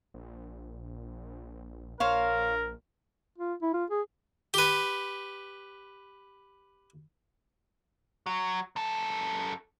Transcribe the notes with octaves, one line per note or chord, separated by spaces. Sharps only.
A#1
A#1 A#4 C5 C#5 F5
F4
E4
F4
G#4
G4 B4
F#3
F#2 A4